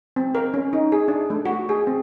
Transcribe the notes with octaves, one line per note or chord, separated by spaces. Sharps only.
C4
A#4
C#4
D#4
G#4
D4
A3
F#4
G#4
C4